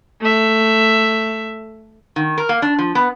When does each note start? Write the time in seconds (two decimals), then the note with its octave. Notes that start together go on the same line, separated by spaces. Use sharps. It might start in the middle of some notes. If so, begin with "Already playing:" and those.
0.21 A3 E5
2.16 D#3
2.38 A#4
2.49 A#3
2.62 D4
2.79 F3
2.95 B3